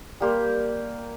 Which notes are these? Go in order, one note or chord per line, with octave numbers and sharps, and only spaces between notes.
G3 A#3 G4 C5